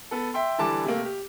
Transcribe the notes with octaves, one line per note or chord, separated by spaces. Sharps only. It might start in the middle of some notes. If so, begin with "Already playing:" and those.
B3 A4
E5 G5 C6
D3 E3 G3 A5 D6
C3 A3 A#3
G4